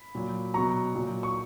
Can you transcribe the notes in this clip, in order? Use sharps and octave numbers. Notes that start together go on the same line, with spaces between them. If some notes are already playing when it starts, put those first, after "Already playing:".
Already playing: B5
A#2 F#3
B2 F#3 A#5 C#6
A#2 F#3
C#6